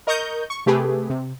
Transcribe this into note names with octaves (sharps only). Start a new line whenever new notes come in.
A#4 D#5 A#5 C#6 D#6 G6
C#6
C3 A3 G4 G#4 B4
C3